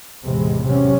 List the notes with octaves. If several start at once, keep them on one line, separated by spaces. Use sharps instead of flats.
A1 E2 C3 G#3
C3 F#3 C#4